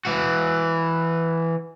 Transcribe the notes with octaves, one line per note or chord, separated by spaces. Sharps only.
E3 F#4